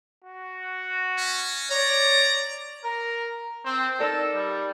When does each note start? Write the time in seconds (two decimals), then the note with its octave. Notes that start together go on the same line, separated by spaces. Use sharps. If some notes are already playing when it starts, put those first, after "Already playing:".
0.24 F#4
1.18 C#4
1.71 C#5 D5 A#5
2.84 A#4
3.65 C4
4.00 D#4 A4 A#4 D5
4.35 G3